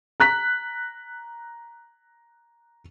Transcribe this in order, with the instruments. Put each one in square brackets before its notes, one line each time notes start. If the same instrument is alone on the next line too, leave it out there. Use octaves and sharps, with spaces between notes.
[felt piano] A#5 F#6 B6